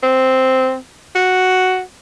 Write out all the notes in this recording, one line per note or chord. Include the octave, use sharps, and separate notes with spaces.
C4
F#4